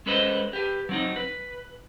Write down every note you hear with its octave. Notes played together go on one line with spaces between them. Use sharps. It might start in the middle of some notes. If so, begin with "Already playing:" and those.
G#3 C#4 A4 B4 C5 D#5
G4 B4
F#3 C4 D#4
B4